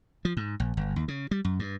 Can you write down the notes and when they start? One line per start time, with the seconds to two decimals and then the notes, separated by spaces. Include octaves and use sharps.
0.25 F3
0.37 G#2
0.60 A#1
0.77 G1
0.96 D#2
1.08 C#3
1.31 G3
1.45 F#2
1.59 G2